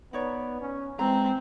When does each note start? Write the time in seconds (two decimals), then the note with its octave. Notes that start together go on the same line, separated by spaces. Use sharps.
0.13 B3 D#4 C#5 D5
0.61 C#4
0.99 E3 G#3 C4 A#5